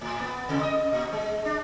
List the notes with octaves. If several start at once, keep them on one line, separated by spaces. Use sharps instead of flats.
A2
B3
C3
D#5
A#2
G#3
D4